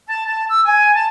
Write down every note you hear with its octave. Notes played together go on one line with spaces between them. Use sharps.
A5
A5
E6
G#5
A5